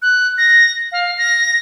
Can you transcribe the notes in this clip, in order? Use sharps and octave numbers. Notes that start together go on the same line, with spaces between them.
F#6
A#6
F5
A#6